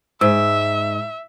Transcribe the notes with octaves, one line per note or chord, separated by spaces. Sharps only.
G#2 E5 E6